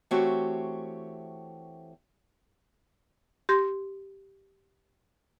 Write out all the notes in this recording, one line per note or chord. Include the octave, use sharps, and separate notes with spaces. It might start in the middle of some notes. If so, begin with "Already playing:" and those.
E3 A3 C4 F#4 G4 C#5
G4 C6 G6 G#6 A#6